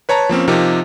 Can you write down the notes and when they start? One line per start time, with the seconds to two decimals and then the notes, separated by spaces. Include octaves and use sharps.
0.09 B4 C#5 A5 A#5
0.29 F3 A#3 C4 C#4
0.48 C3 F3 D#4 G4 A#4